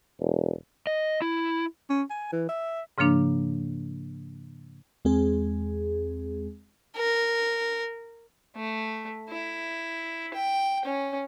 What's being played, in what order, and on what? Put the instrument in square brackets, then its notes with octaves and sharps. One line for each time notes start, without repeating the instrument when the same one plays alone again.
[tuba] E1
[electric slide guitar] D#5
E4
[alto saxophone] C#4
G#5
E3
E5
[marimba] G#2 C#3 F3 A#3 D4
[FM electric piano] E2 G#3 C4 G#4
[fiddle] A#4
[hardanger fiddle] A3
E4
G5
C#4